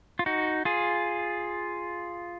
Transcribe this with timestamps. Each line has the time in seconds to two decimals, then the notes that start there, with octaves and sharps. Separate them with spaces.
0.19 F4
0.26 D#4 F#4
0.65 F4 G#4